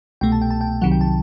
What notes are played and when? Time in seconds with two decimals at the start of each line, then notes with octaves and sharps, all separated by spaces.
0.21 C2 B2 A3 G5
0.32 A5
0.42 G5
0.51 A5
0.61 G5
0.82 C2 C3 D#3 F#3 F#5
0.92 G5
1.01 A5